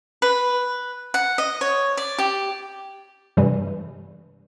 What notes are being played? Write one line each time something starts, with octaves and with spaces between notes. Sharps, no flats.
B4
F#5
D#5
C#5
D5
G4
G2 C3 E3 G3